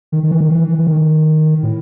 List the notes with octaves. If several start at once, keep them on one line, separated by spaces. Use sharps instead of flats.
D#3
D#3
E3
D#3
E3
E3
E3
D#3
A2